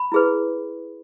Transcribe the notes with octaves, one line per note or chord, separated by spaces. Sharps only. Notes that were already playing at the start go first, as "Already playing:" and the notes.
Already playing: B5
E4 G#4 B4